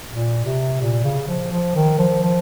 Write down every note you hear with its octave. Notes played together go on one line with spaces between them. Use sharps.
A#2
C3
A#2
C#3
F3
F3
D#3
F3
F3